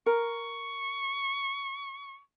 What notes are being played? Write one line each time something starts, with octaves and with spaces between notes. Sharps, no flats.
A#4 C#6